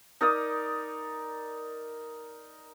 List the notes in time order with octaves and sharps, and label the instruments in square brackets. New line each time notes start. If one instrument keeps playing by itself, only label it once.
[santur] D#4 A#4 D5 D#6